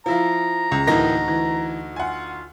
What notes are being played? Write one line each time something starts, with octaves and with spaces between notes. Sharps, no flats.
F3 E4 F4 A#5
C#2
D2 A2 E3 A#3 D#4 A#6
E3
F4 F#5 G#5